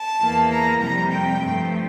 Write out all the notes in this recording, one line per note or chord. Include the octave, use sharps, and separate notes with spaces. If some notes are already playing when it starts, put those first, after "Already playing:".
Already playing: A5
E2 E3 A#3
A#5
F2 C3 G3 A#5
G5
G2 F3 A3 C4